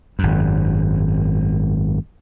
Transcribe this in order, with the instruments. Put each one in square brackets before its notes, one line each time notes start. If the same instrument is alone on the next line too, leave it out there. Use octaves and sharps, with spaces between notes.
[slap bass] G#1 F#2